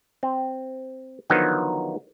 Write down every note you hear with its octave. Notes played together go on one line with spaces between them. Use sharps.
C4
D3 D#3 F3 F#3 B3 D#4